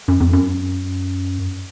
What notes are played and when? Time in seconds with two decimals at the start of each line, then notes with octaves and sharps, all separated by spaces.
0.08 F#2
0.20 F2
0.33 F#2